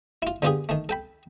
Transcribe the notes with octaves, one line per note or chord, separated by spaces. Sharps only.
E4 F4
D3 B3 F4 G4 G#4
D#3 A3
A4 G5 B5